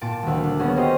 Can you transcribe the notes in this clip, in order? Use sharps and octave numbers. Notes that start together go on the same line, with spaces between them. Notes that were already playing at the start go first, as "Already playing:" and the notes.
A#2 A5 D7
D#1 D2
D4
B3 C#4 F#4 G#4
G4 A4 A#4 C5 D#5